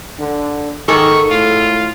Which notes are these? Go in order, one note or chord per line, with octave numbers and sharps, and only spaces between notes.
D3
G#2 D#3 G#4 A4 C#6
A2 F4